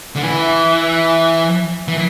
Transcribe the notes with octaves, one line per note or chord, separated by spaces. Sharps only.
D3
E3
E3